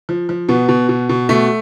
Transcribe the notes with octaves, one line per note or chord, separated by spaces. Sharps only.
F3
F3
B2 B3
B2
B2
B2
B2 A3